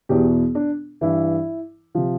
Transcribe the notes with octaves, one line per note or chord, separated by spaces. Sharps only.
E2 B2 G4
D4
G2 E3 E4
C3 F3